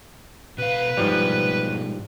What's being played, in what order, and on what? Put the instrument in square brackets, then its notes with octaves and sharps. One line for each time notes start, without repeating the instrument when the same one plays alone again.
[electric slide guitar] B2 F5 [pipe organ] B4
[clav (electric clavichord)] G#2 F3 G3 [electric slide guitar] B2 G#3 C#5